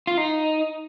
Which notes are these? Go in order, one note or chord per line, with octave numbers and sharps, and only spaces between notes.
F4
D#4